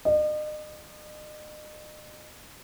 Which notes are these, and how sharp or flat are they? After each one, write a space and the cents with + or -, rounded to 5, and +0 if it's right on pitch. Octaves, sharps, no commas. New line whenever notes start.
D#5 -40